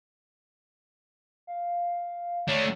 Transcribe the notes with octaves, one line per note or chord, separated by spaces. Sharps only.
F5
A3 D4 C#5